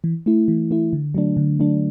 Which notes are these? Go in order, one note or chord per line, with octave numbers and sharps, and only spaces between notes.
E3
A3 E4
E3
A3 E4
D3
F#3 A3 D4
D3
F#3 A3 D4